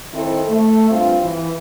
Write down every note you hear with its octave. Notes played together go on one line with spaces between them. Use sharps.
D#3 C4 E4 A4 C5
A3
G2 C4 F4
E3